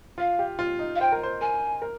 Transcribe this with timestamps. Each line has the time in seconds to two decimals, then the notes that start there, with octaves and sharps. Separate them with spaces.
0.18 F4 F5
0.39 G4
0.59 F4
0.79 D#4
0.95 F5
1.00 C5 G5
1.12 A#4
1.23 C5
1.41 A#4 G#5
1.82 A#4